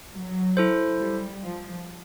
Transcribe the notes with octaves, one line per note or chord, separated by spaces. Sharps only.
F#3
E4 A4 C5
G3
F3